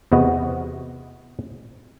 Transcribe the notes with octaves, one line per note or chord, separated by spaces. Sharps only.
E2 C3 B3 F#4 D#5